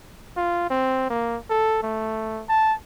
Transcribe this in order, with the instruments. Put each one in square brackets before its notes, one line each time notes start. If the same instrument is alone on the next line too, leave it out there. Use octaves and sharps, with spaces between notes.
[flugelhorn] F4
C4
A#3
A4
A3
A5